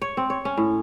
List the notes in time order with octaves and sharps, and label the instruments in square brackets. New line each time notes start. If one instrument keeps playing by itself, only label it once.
[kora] C#5
C4
C#5
C#4
A2